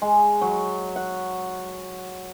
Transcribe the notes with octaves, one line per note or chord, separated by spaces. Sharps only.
G#3
F#3
F#5